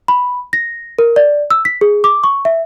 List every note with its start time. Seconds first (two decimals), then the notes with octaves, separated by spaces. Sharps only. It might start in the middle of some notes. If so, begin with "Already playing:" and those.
0.08 B5
0.53 A#6
0.99 A#4
1.16 D5
1.50 E6
1.65 B6
1.81 G#4
2.04 D6
2.24 C#6
2.45 E5